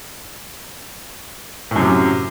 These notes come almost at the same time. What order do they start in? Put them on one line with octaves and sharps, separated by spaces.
A2 F#2 C3